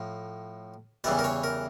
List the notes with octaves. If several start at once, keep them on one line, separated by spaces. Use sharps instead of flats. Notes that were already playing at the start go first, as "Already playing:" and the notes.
Already playing: A2 F3
E2 C#3 E3 G3 D5
A#4
C#5
A#4